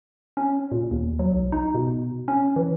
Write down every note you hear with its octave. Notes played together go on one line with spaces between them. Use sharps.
C#4
A#2
D#2
F#3
B1
D#4
B2
C#4
E3